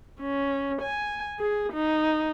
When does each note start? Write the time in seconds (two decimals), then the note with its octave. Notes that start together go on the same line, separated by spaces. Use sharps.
0.21 C#4
0.82 G#5
1.40 G#4
1.73 D#4